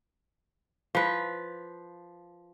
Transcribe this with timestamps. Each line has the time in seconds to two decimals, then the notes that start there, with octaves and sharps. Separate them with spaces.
0.95 F3 B4